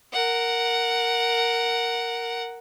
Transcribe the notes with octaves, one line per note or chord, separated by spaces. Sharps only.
A#4 F#5